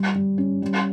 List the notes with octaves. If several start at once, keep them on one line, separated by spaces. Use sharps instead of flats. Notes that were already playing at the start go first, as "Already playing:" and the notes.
Already playing: G3
G3
C#4
G3